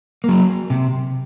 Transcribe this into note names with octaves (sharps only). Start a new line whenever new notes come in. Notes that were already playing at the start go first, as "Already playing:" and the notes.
F#3 A#3
C3